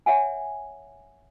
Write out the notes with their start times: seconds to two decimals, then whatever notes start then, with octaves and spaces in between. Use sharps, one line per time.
0.06 C#5 E5 F#5 G#5